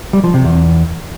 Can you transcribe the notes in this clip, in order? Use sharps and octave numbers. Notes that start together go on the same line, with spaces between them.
G3
F3
C3
E2